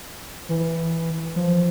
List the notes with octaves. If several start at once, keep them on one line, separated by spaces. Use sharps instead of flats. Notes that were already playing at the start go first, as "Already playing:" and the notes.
E3
F3